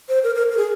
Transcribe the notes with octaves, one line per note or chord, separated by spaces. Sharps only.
C5
A#4
A#4
A#4
G#4